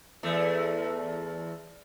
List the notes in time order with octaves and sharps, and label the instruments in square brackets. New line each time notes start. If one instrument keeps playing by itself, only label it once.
[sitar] E2 A3